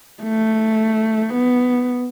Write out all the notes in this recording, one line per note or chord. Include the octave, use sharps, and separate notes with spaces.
A3
B3